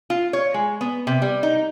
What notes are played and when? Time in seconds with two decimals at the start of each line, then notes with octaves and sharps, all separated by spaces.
0.10 F4
0.33 C#5
0.54 G#3
0.81 B3
1.07 C3
1.22 G3
1.43 D#4